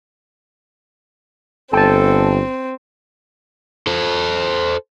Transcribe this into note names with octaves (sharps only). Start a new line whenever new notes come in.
G1 C4 A4 G5 A5
A4 C5